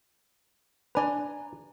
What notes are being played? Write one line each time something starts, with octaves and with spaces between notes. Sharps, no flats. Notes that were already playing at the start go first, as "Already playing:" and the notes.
D4 B4 D5 G#5 A#5